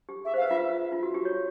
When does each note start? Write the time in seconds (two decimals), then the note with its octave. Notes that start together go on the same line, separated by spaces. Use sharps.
0.09 G4
0.25 G#4 E5
0.34 C5
0.37 F5
0.42 B4
0.48 E5
0.51 F4
0.92 F4
1.03 F#4
1.14 G4
1.25 C#5